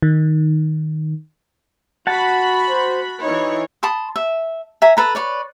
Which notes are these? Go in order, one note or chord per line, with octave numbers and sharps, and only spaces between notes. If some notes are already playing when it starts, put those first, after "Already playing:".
D#3
F#4 F#5 A5 B5
C5
E3 D#4 C#5
A5 B5 C6 D#6
E5
E5 G#5 A#5
A4 B4 A#5
B4 C#5 D5